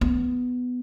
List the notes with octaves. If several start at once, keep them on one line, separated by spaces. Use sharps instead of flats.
B3